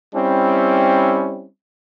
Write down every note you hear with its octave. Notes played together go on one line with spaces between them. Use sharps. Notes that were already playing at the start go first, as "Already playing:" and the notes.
G3 C4 C#4 E4